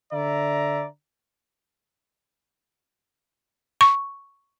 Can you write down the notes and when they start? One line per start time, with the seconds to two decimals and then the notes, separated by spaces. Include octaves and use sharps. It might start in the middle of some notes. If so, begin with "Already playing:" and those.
0.13 D3 D5 E5 A#5
3.81 C#6